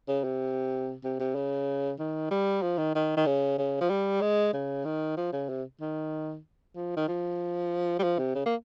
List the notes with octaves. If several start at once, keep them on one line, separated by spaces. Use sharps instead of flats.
C#3
C3
C3
C3
C#3
D#3
G3
F3
D#3
D#3
D#3
C#3
C#3
F3
G3
G#3
C#3
D#3
F3
C#3
C3
D#3
F3
D#3
F3
G3
F3
C3
C#3
A#3